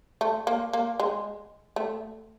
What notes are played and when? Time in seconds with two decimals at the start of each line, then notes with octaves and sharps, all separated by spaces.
0.21 A3
0.47 A#3
0.73 A#3
1.00 G#3
1.76 A3